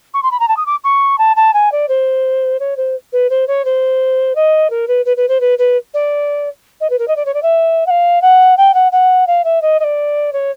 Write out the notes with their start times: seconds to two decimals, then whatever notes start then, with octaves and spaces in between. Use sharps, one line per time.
0.14 C#6
0.23 C6
0.31 B5
0.40 A#5
0.48 A5
0.57 D#6
0.66 D6
0.84 C#6
1.18 A5
1.36 A5
1.54 G#5
1.72 D5
1.89 C5
2.60 C#5
2.77 C5
3.13 B4
3.30 C5
3.48 C#5
3.65 C5
4.35 D#5
4.70 A#4
4.88 B4
5.05 B4
5.17 B4
5.28 C5
5.41 B4
5.59 B4
5.94 D5
6.81 D#5
6.90 B4
6.99 A#4
7.08 D#5
7.16 D5
7.26 C#5
7.34 D5
7.43 E5
7.87 F#5
7.90 F5
8.22 F#5
8.57 G5
8.74 F#5
8.92 F#5
9.27 F5
9.45 E5
9.62 D#5
9.80 D#5
9.84 D5
10.33 C#5